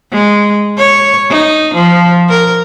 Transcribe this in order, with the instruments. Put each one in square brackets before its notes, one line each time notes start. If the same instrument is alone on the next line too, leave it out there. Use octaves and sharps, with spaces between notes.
[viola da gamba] G#3
C#5
D#4
F3
A#4